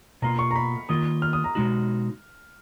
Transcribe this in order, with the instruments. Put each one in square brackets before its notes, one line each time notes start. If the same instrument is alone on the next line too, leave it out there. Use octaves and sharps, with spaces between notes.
[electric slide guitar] B2 A#3 F4 [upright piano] A#5
[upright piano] C#6
A#5
B5
[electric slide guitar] D#3 A#3 F4 [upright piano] D#6
[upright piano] F6
D#6
A#5
[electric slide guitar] B2 G#3 D#4 F#4